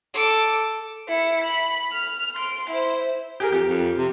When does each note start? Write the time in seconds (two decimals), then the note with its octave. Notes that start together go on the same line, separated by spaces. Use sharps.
0.14 A4 D6
1.08 E4 C#7
1.44 B5
1.92 F6
2.35 C6 D7
2.70 E4 C5
3.40 G4 G#4 A#4
3.52 F2 G4
3.68 F2
3.97 C3